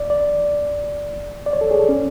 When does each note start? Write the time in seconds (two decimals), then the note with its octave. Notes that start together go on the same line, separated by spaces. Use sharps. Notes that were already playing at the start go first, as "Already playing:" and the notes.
Already playing: D5
0.10 D5
1.46 D5
1.53 C#5
1.61 A4
1.71 G#4
1.79 A4
1.89 C#4